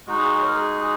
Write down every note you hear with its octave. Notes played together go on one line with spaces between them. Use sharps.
G#3 D#4 F#4
G#4
G#4
C#5
A#4
G#4
G#4